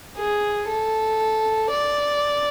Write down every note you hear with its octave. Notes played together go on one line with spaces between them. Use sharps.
G#4
A4
D5